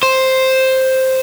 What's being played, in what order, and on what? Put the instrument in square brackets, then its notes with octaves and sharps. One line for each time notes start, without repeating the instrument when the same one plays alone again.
[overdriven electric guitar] C5